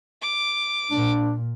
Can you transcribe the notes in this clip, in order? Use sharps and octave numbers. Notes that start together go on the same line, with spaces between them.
D6
A#2 D4